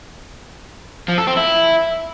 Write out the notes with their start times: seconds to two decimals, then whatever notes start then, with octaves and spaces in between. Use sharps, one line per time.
1.09 F3
1.18 A4
1.27 C4
1.36 E4